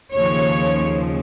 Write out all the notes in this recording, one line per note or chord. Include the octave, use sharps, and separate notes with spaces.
D#2 C#3 F3 C#5